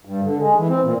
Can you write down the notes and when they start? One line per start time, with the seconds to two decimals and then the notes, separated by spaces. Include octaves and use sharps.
0.05 G2
0.24 D3
0.39 G#3
0.56 E3
0.69 C4
0.83 A#2